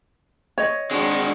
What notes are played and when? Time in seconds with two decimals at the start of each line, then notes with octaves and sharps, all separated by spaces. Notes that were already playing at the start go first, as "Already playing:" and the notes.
0.58 C#5 D#5
0.91 D#3 G#3 C4 D4 F#4 G#4